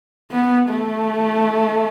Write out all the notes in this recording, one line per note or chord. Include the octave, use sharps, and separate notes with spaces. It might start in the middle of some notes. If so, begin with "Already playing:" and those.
B3
A3